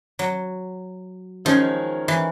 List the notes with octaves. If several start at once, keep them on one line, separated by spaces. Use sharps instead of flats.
F#3
D#3 F3 G#3 C#4
E3